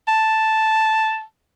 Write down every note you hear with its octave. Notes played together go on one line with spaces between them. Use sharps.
A5